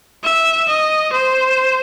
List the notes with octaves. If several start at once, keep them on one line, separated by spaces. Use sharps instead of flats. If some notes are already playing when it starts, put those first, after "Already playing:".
E5
D#5
C5